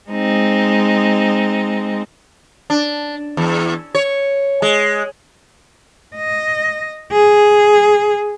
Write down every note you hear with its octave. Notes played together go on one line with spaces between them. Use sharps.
G#3 C4 D#4
D4
E2
C#5
G#3
D#5
G#4